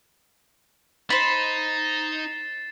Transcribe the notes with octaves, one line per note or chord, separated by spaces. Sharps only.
D#4 C5 B5 A6 C7 E7